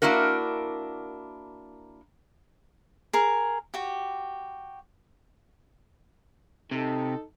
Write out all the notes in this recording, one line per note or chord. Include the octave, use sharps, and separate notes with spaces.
A#3 D4 E4 F#4 A#4
G#4 A#4
F#4 G4
C3 D#4 A4